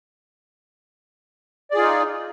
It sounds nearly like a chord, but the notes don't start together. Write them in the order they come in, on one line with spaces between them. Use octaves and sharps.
D5 G#4 F4 D#4